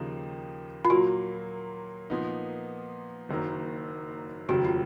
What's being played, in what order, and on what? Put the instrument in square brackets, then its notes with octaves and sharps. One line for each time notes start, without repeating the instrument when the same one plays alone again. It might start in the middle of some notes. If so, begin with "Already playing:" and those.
Already playing: [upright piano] D#2 C#3 F3 A#3 D#4
[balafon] F4
[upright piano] A#2 F#3 A#3 [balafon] F#4
[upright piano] A#2 F3 B3 D#4
F#1 F#2 D#3 F#3 A#3
[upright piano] F1 D#2 C#3 F#3 [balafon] F#4
[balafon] F4